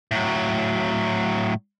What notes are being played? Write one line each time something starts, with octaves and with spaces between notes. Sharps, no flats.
A2 F#3